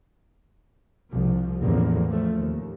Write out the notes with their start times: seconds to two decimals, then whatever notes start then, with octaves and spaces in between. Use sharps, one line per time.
1.11 C2 F3
1.62 A1 E2 D3 F3 A#3
2.07 F3 A3
2.37 D#2